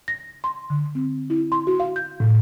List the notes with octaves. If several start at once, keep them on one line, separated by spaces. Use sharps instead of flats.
A#6
C6
D3
C4
E4
C6
F#4
F5
G6
A2